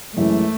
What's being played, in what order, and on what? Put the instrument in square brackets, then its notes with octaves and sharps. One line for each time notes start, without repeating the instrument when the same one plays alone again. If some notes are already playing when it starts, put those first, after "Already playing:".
[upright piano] F#2 E3 G#3 [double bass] A3